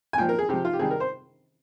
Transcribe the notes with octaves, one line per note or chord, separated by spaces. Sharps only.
G#5
A#2 F3 G5
A#4
G#4
C3 F3 G4
F4
G4
C3 D#3 G3 G#4
A#4
C5